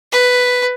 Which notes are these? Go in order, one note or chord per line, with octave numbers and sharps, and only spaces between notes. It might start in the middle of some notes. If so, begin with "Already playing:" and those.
B4